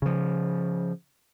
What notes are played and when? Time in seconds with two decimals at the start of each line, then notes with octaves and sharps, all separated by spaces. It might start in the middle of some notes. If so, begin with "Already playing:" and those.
0.02 C#3 F3